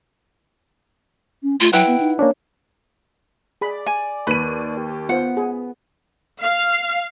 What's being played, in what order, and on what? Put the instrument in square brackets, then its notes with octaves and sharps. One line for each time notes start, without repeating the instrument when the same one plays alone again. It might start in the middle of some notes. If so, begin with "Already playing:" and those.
[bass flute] C#4
[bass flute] A3 [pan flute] F4
[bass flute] F#3 [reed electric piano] E4 B4 F#5 [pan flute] G5
[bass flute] B3
D#4
[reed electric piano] A#3 C#4 D4 [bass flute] C#5
[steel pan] G#4 B5 [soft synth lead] D5
[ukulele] G#5
[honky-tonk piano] D#2 D#7 [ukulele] B4 [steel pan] B5
[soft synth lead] G4
[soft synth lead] B3 [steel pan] F4 C5 [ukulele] F#5
[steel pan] G#4
[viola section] F5